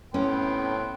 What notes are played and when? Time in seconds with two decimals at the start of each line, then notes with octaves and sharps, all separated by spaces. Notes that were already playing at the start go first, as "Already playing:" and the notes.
0.14 A2 B3 C#4 G5 C6